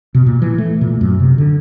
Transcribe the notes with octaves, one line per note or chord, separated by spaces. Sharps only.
B2
A#2
E3
A3
A#2
F#2
C3
D3